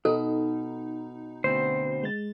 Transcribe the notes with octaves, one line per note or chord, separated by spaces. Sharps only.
B2 D#4 A4
D2 B2 C4 C5
G#3 A6